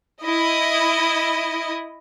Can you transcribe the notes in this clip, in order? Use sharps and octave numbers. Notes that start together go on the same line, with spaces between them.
E4 D#5